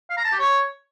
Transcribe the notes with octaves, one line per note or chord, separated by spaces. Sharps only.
F5
A#5
A5
G4
C#5